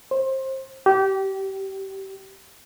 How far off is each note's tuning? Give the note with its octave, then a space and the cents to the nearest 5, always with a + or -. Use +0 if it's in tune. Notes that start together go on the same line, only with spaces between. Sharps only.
C5 +25
G4 -25